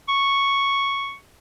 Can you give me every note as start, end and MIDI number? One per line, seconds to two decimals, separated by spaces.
0.09 1.15 85